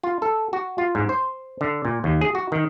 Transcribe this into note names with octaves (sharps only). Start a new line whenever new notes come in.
F4
A4
F#4
F4
G#2
C5
D3
A#2
D#2
G#4
F#4
D#3